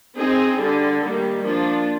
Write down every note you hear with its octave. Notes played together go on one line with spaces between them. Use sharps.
C4 D#4 G#4
D3 G3 D4
D#3 G3 A#3
F3 A#3 D4 F4